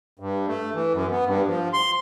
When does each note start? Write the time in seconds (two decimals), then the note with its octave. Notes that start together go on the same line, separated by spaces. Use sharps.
0.19 G2
0.47 A3
0.74 E3
0.93 F#2
1.11 B3
1.25 G2
1.48 F3
1.73 C6